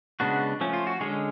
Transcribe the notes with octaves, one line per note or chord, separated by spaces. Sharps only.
C#3 G#3 B3 D4 F#4
F3 A3 C#4
F4
F#4
D3 G#3 C#4 G#4